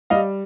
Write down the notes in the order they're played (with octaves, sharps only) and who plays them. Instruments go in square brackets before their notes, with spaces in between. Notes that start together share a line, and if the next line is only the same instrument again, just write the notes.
[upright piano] G3 D#5 F5